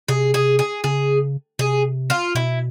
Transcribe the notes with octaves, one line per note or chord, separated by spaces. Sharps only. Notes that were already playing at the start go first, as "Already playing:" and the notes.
C3 G#4
G#4
G#4
C#3 G#4
C3 G#4
F4
B2 E4